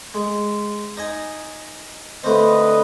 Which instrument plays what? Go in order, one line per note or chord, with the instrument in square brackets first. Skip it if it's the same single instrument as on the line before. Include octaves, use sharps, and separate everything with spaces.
[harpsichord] G#3
D#4 D#5 G#5
[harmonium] D3 B4 D#5 [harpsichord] A3 C4